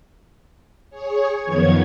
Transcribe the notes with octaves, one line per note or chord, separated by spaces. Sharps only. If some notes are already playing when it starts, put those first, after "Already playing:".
G#4 C#5
F#2 D#3 F3 B3 C#5 G#6